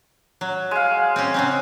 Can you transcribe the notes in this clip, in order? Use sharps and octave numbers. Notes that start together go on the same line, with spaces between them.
F#3
G#3 F5
C4 C#4
C#3 F#3 C4